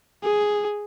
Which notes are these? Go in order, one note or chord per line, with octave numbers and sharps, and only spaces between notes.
G#4